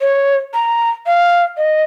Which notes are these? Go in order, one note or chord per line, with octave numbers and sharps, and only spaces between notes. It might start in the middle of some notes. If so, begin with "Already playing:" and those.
C#5
A#5
F5
D#5